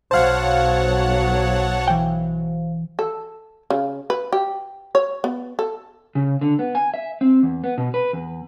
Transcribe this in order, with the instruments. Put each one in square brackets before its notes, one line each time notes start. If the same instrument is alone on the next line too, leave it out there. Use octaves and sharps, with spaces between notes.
[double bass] B1 F#3 [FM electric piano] C5 F5 [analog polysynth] C#5 F#5 A5
[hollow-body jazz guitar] E3 G5
[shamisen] A4
C#3
B4
G4
C#5
B3
A4
[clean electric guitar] C#3
D3
B3
G#5
E5
C4
E2
B3
B2
B4
E2